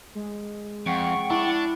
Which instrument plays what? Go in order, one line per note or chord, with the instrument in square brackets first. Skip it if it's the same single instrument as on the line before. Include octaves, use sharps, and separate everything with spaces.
[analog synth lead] G#3
[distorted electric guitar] F2 [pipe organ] F#5 G5 C#6
[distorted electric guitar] D4 [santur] E4